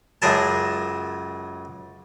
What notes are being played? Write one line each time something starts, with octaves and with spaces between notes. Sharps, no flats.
C#2 F#2 G#4 A#4 A5